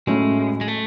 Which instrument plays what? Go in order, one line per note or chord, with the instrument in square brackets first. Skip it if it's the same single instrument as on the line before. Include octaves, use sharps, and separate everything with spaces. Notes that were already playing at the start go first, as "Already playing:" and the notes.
[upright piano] A2 F#3 A3 C#4 [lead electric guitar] G#3
[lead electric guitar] G#3
A3